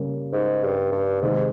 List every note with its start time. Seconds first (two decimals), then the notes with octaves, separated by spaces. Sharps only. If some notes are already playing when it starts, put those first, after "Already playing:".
Already playing: C#3 G3 A#3
0.33 G#2
0.63 G2
0.92 G2
1.22 G#2 C3 D#3 G#3